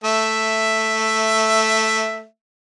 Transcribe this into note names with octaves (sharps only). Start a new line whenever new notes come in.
A3 E5